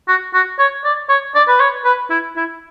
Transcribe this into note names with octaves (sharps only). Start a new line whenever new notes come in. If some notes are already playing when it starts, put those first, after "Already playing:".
F#4
F#4
C#5
D5
C#5
D5
B4
C#5
B4
E4
E4